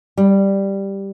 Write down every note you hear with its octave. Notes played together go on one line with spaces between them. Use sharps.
G3